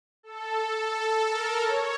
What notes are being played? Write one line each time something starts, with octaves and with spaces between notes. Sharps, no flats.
A4
A4
A4
A#4
C#5